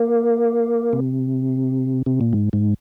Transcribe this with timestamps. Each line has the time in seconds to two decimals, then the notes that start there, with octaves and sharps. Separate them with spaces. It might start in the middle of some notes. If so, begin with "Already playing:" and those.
Already playing: A#3
0.93 C3
2.06 C3
2.21 A#2
2.33 G#2
2.53 G#2